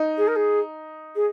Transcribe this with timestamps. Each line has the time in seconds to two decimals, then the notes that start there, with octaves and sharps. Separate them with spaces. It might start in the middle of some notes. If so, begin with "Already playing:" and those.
Already playing: D#4
0.17 G#4
0.27 A#4
0.35 G#4
1.15 G#4